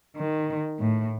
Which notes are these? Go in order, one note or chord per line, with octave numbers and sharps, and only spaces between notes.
D#3
A2